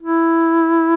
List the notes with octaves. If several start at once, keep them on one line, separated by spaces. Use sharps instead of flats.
E4